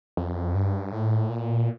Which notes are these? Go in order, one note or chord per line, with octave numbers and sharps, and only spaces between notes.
F2
G2
A2
A#2